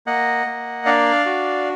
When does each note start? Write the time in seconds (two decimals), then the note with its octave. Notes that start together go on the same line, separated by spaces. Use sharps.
0.07 A#3 D#5 F#5
0.47 A#3
0.86 D4 D5 F5
1.26 F#4